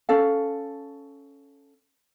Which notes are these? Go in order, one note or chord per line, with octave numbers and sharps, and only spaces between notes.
C#4 A4 F5